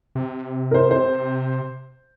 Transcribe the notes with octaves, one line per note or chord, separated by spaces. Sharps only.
C3
A#4 C5
C5